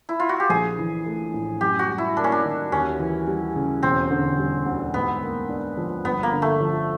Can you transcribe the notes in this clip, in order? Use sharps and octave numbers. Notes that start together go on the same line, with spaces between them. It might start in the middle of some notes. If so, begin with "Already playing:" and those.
E4
F4
F#4
G4
A#1 G#4
E3
A3
A2
F#2 G4
F#4
G3
E4
A#3 D4
C#4
D4
D#3
D#2 C#4
E3
G3
C#3
E1 C4
D3
G3
D2
G#2 B3
A#3
D4
F3
G1 B3
A#3
D3
A3
F3